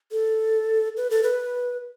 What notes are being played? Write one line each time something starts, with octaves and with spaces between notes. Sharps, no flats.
A4
B4
A4
B4